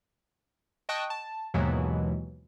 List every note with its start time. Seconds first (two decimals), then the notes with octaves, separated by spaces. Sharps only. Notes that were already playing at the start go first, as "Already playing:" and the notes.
0.89 D#5 G5 A5 C#6 D#6 F#6
1.10 A5
1.54 D#2 G#2 B2 E3 F#3 G#3